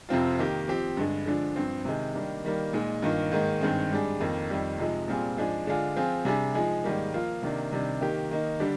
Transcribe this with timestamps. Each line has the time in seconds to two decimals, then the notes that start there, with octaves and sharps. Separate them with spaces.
0.09 F2 C3 F3 C4 F4
0.39 D#3 A#3 D#4 G4
0.68 F3 C4 G4
0.97 G2 D3 G#3
1.26 D3 F3 G#3 D4 G#4
1.56 G2 F3 C4
1.85 C3 D#3 G#3
2.14 D#3 G3 A#3 D4
2.45 D#3 G3 A#3
2.73 A#2 G#3 D#4
3.02 G2 D#3 A#3 F4
3.32 G#2 D#3 A#3 D#4
3.61 G2 D#3 G#3 C4
3.91 G#2 G3 D4 G#4
4.20 F2 D#3 A#3
4.50 F2 D#3 G3
4.79 C3 F3 G#3 D#4
5.08 A#2 G3 C4 F4 G#4
5.37 G#2 F3 G#3 D4 G#4
5.67 D3 G#3 D4 F4 G#4
5.96 F3 C4 F4 G#4
6.25 C3 G3 D4 G#4
6.54 F3 G#3 D#4 G#4
6.84 G#2 D#3 G3 A#3
7.14 F3 A#3 F4
7.42 C3 D#3 A#3 D4
7.72 C3 D#3 G3 D4
8.01 D#3 A#3 D#4 G4
8.31 D#3 A#3 D#4
8.60 D3 G3 D4 G4